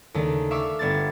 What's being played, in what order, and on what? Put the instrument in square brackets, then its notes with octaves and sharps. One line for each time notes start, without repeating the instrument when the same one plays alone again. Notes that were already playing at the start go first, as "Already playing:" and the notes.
[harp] D#2 C#3 A3 D4
E5 F5 C#6 D6 E6
G1 B3 D4 G#6 A6